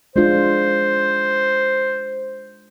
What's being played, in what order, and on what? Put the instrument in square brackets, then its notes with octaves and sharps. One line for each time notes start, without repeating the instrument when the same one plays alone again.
[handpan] G#3 D4 F4 [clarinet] C5